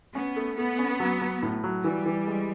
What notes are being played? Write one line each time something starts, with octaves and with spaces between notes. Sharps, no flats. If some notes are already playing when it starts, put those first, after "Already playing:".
B3 C#4
A3
A3 B3
C#4
F#3
F#3
A2
F#3
E3 G3
E3
G#3